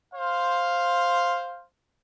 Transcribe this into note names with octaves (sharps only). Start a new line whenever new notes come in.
C5 F5